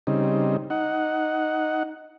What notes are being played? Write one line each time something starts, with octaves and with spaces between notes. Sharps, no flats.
C#3 G3 C4 D#4
D#4 F#5